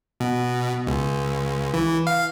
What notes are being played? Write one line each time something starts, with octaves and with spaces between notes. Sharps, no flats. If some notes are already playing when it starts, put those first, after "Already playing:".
B2
C#2
E3
F5